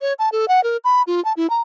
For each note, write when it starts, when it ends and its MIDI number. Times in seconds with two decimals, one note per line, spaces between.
0.02 0.13 73
0.19 0.29 81
0.32 0.48 69
0.48 0.63 78
0.64 0.77 70
0.84 1.02 83
1.07 1.23 65
1.25 1.33 81
1.37 1.49 64
1.50 1.61 82